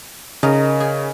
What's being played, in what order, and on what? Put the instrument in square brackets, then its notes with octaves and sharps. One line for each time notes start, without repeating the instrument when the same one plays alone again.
[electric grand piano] C#3 [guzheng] D#4 A#4
[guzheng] G#4